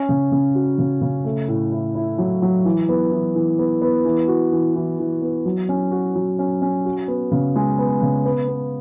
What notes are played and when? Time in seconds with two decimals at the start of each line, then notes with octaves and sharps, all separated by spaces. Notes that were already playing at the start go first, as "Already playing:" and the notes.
Already playing: C#4
0.09 C#3
0.32 C#3
0.55 F#4
0.79 C#3
1.01 C#3
1.24 A3
1.48 A2
1.72 E4
1.95 E4
2.18 F#3
2.42 F#3
2.65 E3
2.89 B3
3.12 E3
3.35 E3
3.59 B3
3.82 B3
4.05 E3
4.28 F#4
4.52 E3
4.76 E3
4.99 E3
5.22 B3
5.46 F#3
5.69 C#4
5.92 F#4
6.15 F#3
6.39 C#4
6.62 C#4
6.85 F#4
7.08 B3
7.32 C#3
7.56 G#3
7.79 B3
8.02 C#3
8.25 B3
8.48 B3